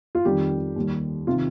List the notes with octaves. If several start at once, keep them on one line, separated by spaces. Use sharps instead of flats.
F4
F2 D#3 G3 G4
D#2 D#3 G3
C3 D#3 F4